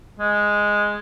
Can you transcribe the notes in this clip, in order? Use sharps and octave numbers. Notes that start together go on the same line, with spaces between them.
G#3